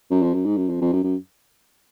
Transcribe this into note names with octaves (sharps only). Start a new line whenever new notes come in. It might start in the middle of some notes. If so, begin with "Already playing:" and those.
F#2
F2
F#2
G#2
F#2
F2
F2
F#2
F#2